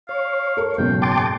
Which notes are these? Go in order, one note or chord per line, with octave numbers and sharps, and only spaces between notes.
C#5 F5
A4 A#4
F#1 G#2 B2 G5
G5 A5 C6 D6